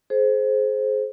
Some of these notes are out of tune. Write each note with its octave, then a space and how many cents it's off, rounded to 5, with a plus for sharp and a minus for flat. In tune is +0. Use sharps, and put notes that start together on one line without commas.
G#4 +35 C5 +0